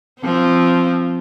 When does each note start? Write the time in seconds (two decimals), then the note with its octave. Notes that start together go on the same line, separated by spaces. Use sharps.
0.21 F3 C4